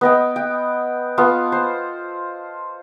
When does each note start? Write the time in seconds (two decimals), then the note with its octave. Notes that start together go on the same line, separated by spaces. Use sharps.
0.01 B3 D#5 G5
0.36 G5
1.18 B3 F4 A4
1.52 C5